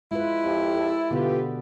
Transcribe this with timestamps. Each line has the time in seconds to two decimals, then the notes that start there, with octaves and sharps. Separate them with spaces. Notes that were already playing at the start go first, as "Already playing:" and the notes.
0.11 G#3 E4 F4 B4
0.43 F2 G4
0.76 A4
1.11 B2 D3 B3 F4 G4 B4